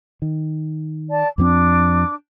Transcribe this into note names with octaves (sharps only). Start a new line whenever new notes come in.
D#3
D5 A5
F2 F3 C4 D4 D6